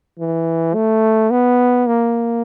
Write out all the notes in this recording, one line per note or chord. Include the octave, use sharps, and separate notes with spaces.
E3
A3
B3
A#3